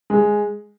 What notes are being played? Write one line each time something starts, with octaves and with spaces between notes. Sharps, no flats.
G#3